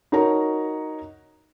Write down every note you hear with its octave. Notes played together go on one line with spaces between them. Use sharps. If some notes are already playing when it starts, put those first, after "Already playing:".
D#4 F#4 A#4 C#5 A#5